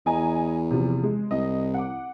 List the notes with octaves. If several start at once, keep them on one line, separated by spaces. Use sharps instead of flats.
E2 D#5 G#5 A#5
C3 F3
G#3
C2 D#5
F#5 D6